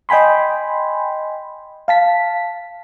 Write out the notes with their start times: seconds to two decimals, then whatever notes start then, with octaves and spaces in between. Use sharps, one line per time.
0.09 D#5 G5 G#5 B5 C6
1.88 F5 A5 B6